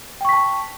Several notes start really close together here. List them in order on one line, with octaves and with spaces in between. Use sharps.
G5 C#6 B6 A5